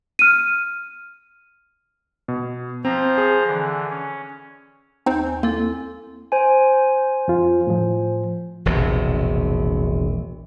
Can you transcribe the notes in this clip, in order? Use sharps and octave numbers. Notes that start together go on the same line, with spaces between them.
F6 D#7
B2
F3 C4 C5 A#5
G#4
D3 E3
C#4
D#2 C4 D#4 C5 G6
G#5
A#3 C4 E4 A4
C5 G#5
F2 F4
A2 F3
E1 A#1 C3